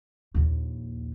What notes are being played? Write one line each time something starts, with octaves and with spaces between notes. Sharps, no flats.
A#1 D#2